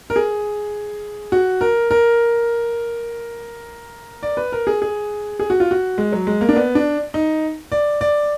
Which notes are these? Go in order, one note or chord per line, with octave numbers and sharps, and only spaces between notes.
A#4
G#4
F#4
A#4
A#4
D5
B4
A#4
G#4
G#4
G#4
F#4
F4
F#4
G#3
F#3
G#3
A#3
D4
B3
D4
D#4
D5
D5